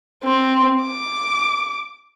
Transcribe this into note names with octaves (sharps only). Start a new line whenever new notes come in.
C4
D6